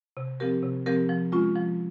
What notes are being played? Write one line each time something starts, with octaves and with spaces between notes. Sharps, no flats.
C3
F3 C4 G4 A#4
C3
F3 C4 G4 A#4
F3
G#3 C#4 F4
F3